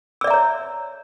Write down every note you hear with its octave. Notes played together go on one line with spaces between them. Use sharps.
C#5 D5 E5 A#5 E6